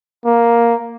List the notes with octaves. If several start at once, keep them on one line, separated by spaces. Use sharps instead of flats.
A#3